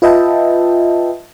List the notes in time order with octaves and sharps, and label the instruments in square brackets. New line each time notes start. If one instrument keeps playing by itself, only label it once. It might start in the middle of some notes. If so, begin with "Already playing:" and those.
[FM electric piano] F4 B4 D#5 E5 G5 A5